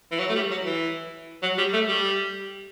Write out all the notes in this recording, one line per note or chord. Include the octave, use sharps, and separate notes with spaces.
E3
F#3
A3
G3
F#3
E3
F#3
G3
A3
G3